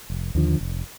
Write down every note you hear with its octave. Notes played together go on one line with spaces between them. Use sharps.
F1
D#2 D3 F3
F1